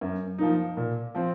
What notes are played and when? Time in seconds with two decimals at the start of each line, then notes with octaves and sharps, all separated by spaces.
0.01 F#2
0.38 F3 A#3 D#4
0.77 A#2
1.15 F3 C4